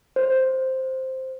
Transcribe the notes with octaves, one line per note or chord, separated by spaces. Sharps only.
C5